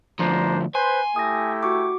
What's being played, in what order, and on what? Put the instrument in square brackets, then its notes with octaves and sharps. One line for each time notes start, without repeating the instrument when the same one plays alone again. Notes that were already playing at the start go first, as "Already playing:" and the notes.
[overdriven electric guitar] D2 F3 [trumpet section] D4 C5 A#5
[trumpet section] B4 C5 [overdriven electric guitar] G#5 [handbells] C6
[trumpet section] A3 E4 G4 [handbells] D#6 A#6
[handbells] F#4 C#6 D6